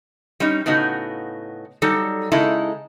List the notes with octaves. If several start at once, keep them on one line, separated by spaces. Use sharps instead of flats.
G3 C#4 D#4
A2 C#3 B3 D#4 F#4
F#3 G3 D#4 A4
C#3 G#3 D#4 E4 A4